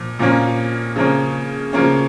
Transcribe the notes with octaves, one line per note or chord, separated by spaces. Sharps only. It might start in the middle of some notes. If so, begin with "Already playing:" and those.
Already playing: A#2 F3
A#2 F3 A#3 C#4
C#3 F3 A#3 C#4
C#3 F3 A#3 C#4